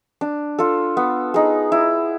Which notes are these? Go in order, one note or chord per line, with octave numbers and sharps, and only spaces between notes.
D4
F4 A4
B3
D#4 G#4
E4